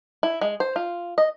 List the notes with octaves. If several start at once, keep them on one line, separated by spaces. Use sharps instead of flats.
E4
G#3
C5
F4
D#5